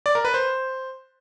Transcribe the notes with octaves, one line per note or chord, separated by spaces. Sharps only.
D5
A#4
B4
C5